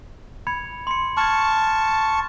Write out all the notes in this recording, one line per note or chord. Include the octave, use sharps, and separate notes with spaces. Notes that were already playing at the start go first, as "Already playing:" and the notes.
B5 G#6 C#7
C6 C#7
A5 C#6 F6 G#6
A6